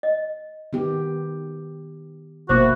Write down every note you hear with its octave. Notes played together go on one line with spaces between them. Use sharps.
D#5
D#3 B3 G4
G1 B2 A#3 E4 F#4 C5 D6